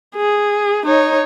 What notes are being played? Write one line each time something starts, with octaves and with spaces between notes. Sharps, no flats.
G#4
D#4 C#5